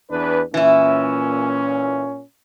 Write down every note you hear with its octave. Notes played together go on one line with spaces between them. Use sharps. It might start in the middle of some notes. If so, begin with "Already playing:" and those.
E2 D4 B4
A#2 E3 C#4 E4